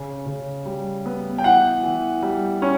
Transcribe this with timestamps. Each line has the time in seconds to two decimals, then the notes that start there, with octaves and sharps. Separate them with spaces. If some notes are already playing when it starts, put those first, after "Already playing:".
Already playing: C#3
0.26 C#3
0.66 G3
1.06 B3
1.38 G5
1.44 E3 F#5
1.83 E3
2.22 G3
2.62 C#4